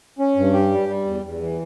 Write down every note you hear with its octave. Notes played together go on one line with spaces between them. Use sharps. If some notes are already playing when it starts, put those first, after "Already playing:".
C#4
G2
G4
G3
G3
E2
E2
E3